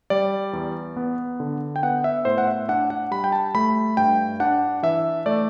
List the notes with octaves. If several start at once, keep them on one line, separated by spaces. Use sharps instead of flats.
G3 D5
E2
B3
D3
G5
B3 F#5
E5
A2 C5
F#5
E5
D4 F#5
F#5
G3 B5
G5
A5
A3 B5
G2 G5
D4 F#5
E3 E5
A3 D5